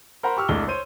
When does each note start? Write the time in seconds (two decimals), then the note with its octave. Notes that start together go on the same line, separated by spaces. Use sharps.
0.23 A#4 C5 F#5 A#5 B5
0.37 G4 C#6 E6 F6
0.48 C2 G#3 A3 D4 E6 G7
0.68 C5 C#5 D#7